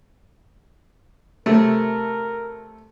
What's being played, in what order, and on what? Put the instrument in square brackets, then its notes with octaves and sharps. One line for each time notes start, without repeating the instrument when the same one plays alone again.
[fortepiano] C3 A3 [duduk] A#4